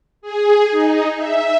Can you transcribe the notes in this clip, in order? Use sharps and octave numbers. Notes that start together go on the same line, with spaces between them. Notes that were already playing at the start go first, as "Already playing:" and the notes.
G#4
D#4
E5